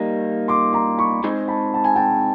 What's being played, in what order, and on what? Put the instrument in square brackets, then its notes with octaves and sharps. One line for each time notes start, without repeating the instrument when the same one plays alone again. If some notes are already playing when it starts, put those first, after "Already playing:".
Already playing: [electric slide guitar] G3 A#3 D#4
[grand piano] C6 D6
A#5 C6
B5 C#6
[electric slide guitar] G#3 C4 D#4 G#4 C5
[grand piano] A5 B5
A5
G#5
G5 A5